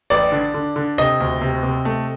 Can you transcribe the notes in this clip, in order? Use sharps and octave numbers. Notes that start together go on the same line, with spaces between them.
A1 D5
D3
D3
D3
C3 D#5
D2
C3
C3
A3